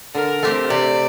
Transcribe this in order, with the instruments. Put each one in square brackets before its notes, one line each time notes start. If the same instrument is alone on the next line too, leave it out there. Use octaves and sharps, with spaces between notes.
[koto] D3 [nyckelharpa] A#4
[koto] A3 C4 G4 C5
[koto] C3 [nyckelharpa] D5